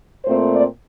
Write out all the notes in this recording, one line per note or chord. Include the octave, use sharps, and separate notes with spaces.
A#2 A3 C4 C5
D5